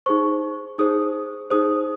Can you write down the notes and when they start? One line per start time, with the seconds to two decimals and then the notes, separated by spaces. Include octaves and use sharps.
0.06 D#4 G#4 C5 C#6
0.78 D#4 G#4 C5 D#6
1.50 D#4 G#4 C5 D#6